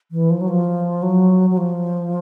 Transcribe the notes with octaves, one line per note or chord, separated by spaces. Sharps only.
E3
F3
F#3
F3
F#3
F#3
F3